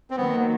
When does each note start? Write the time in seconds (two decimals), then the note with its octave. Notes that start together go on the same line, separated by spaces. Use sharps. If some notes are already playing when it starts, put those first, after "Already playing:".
0.10 C4
0.17 D#3 F#3 A#3 B3